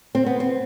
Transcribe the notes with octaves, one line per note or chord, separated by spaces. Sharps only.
C4
B3
C4